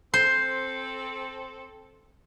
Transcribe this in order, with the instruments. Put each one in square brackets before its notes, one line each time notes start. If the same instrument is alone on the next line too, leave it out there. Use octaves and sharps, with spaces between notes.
[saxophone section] C4 A4 [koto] C5